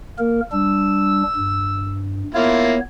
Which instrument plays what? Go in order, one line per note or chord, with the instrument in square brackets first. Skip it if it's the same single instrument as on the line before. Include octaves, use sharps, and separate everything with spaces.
[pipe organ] A#3 A#4
[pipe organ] G3 D4 [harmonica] E6
[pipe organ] G2
[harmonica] A#3 E4 F4 [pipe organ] B3 C#5